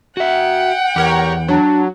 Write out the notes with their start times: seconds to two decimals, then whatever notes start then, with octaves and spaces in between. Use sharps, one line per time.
0.17 F#4 E5 F#5 G5
0.96 E2 G4 A#4 C#5
1.48 F#3 D4